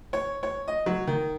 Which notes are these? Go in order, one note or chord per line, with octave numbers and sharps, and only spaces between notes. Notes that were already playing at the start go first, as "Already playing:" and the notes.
C#5
C#5
D#5
F#3
D#3